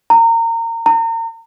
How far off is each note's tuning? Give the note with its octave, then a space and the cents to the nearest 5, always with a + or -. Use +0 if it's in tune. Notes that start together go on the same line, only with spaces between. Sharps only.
A#5 -25
A#5 -35